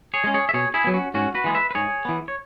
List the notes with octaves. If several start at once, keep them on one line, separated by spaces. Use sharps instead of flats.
G#4 C#5
G#3 C#4
G#4 C#5
E5
B2 G#4 C#5
E4 G#4
F#3 B3
C#4 F#4
G#2 C#4 F#4
F#4 B4
E3 G#3 B3
B4 E5
B4
G#2 G#4 C#5
E3 B3
C#5